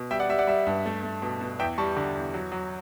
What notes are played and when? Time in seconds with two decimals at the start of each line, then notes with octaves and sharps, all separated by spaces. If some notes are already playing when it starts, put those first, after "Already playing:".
Already playing: B2
0.11 G3 E5 G5
0.19 D5 F#5
0.29 G3 E5
0.38 D5 F#5
0.47 G3 E5
0.67 G2
0.86 A3
1.03 A3
1.22 B2
1.41 B2
1.59 E2 E5 G5
1.78 G3 A5 C#6
1.97 D3
2.15 E2
2.34 F#3
2.52 F#3